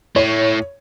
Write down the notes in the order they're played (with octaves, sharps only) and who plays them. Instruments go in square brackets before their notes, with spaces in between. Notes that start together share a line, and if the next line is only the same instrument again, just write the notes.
[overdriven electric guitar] A2 [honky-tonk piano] C#5